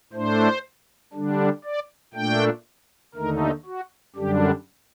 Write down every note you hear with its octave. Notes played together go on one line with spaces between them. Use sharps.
A2 A3 D4 C5
D3 G3 D4
D5
A#2 A3 D4 G5
D#2 D3 A3 D#4 A#4
F#4
F#2 D3 G3 D4 G4